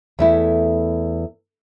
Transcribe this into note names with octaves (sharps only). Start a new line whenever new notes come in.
E2 A3 E4